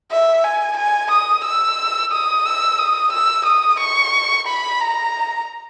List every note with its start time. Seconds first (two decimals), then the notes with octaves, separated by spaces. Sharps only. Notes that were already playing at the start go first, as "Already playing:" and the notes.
0.11 E5
0.44 G#5
0.78 G#5
1.11 D#6
1.44 E6
2.12 D#6
2.46 E6
2.79 D#6
3.12 E6
3.46 D#6
3.80 C#6
4.47 B5
4.81 A#5